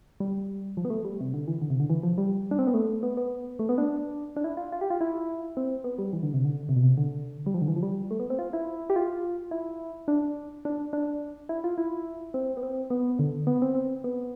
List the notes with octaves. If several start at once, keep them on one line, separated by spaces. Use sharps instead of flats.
G3
F3
B3
A3
G3
C3
D3
E3
D3
C3
D3
E3
F3
G3
D4
C4
B3
A3
B3
B3
A3
B3
D4
D4
E4
F4
F4
G4
F4
E4
C4
B3
G3
E3
D3
C3
D3
C3
B2
C3
D3
G3
F3
D3
E3
F3
G3
A3
B3
C4
F4
E4
G4
F4
E4
D4
D4
D4
E4
F4
E4
C4
B3
C4
B3
D3
B3
C4
C4
B3